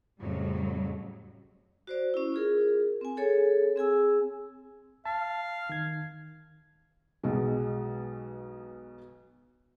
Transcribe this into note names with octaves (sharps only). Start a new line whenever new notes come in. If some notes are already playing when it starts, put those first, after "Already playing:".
F2 A2 C#3 F#3 G3
F#4 C5 D5
C#4 E4
F4 G#4 A#4
C4 G#5
G#4 A4 C#5
C4 G#4 G#5 E6
F5 A5
D#3 G#6
B1 B2 F#3 G#3